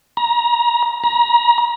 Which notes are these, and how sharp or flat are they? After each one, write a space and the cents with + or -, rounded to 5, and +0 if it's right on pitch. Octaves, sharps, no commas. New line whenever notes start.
A#5 +20
A#5 +30